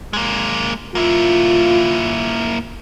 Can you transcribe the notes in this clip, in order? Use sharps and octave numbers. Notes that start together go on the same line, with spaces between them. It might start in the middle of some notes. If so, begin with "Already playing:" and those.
G#3 A#3
A#3 E4 F4